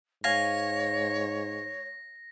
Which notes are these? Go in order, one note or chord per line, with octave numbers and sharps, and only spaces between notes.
G#2 C#5 F5 G#5 A#6